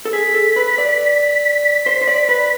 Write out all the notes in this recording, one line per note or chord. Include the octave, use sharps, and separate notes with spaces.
A4
G#4 B6
A4
B4
D5
C5
C5
D5
B4